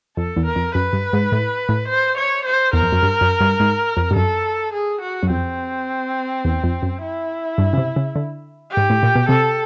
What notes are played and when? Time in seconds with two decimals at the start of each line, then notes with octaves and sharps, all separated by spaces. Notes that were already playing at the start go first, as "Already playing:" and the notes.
0.17 F2 A4
0.37 E2
0.45 A#4
0.56 F2
0.75 F#2 B4
0.93 G2
1.13 G#2
1.32 A2
1.69 A2
1.88 C5
2.17 C#5
2.45 C5
2.73 E2 A#4
2.82 F2
2.92 F#2
3.03 G2
3.21 F#2
3.40 G2
3.60 G#2
3.97 F2
4.11 G2
4.16 F#2 A4
4.73 G#4
5.01 F#4
5.23 F#2
5.30 F2 C4
6.45 E2
6.64 F2
6.82 F#2
7.01 E4
7.58 G2
7.73 C#3
7.78 C3
7.96 C#3
8.16 D3
8.71 G4
8.77 G#2
8.90 A2
9.03 A#2
9.15 B2
9.29 C3 A4